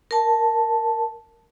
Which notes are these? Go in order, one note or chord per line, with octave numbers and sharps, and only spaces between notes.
A#4 A5